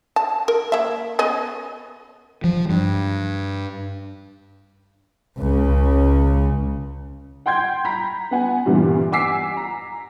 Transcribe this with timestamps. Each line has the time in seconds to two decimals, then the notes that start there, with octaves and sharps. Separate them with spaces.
0.16 A5
0.48 A#4
0.72 A#3 E5
1.19 B3 C#4 D#5
2.44 F3
2.70 G2
5.38 C#2 C#3
7.46 F#5 G5 C6 G6 G#6
7.85 A#5 B5 B6
8.31 B3 F#5 G#5
8.66 G2 A#2 D3 E3 G3 B3
9.12 F#5 G#5 D6 E6 B6 C7
9.57 A#5